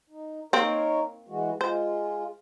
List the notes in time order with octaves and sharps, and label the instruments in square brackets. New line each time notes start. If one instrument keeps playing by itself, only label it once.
[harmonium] D#4
[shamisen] A#3 C4 [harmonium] D#4 A#4 C#5
[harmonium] E3 G#3 F#4
[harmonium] G#3 F4 [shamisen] C5